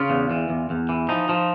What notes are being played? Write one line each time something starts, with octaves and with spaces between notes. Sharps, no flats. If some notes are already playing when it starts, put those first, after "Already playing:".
Already playing: C#3 F4
E2
E3
E2
E2
E3
F3 D#4
F3